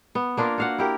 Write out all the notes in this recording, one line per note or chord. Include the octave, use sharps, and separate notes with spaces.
B3
A#3 D4 F4 A#4
F#4 F5 F#5
E4 G4 A#4